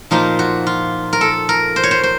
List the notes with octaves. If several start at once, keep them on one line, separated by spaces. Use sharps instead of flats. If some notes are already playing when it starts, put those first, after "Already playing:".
A#2 F3 A#3 D#4 F4
F#4
F4
A#4
A4
A#4
C5
C#5
C5
C5